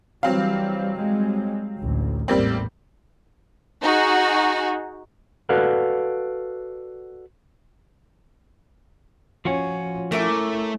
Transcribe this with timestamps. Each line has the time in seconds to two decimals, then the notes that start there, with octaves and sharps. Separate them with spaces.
0.23 E3 F#3 G3 C4 F5
0.95 G3 G#3
1.78 A1 D2
2.28 A1 E2 A2 G3 A#3 C4
3.81 D#4 F#4 G#4
5.49 F#4 A4 B4 D5 F5 F#5
9.45 F3 C#4 F4 F#4
10.12 A3 C#4 E4 A#4 E5 D6